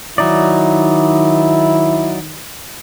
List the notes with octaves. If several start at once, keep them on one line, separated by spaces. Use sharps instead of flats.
D#3 F#3 D#4 E4 D5